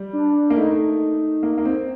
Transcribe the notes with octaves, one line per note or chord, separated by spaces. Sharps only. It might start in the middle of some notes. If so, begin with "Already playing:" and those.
Already playing: G3
D4
A#3
A3 D#4
A#3
A#3
C4